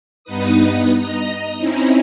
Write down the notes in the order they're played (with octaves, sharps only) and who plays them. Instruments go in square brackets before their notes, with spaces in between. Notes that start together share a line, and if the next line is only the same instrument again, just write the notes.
[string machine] G2 B3 D#4 B4 D#6
D#5 A#5
C4 C#4 D#4 E4